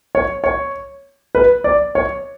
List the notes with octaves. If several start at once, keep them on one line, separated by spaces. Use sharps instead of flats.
C#5
C#5
B4
D5
C#5